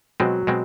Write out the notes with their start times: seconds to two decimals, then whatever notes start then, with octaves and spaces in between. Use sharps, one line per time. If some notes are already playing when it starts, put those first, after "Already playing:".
0.20 B2 F#3 G#3 C4
0.47 B2 G#3 C4